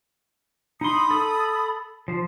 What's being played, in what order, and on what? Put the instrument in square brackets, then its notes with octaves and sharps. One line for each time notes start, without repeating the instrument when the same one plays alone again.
[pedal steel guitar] D#4 C6 [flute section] B5 D#6
[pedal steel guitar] A4
F3 C5